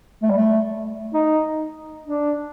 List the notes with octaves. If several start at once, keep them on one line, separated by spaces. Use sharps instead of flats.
A3
G3
A3
D#4
D4